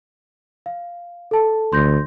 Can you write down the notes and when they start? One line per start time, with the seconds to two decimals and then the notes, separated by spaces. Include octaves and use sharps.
0.66 F5
1.31 A4 A5
1.73 D2 C6 G6 A#6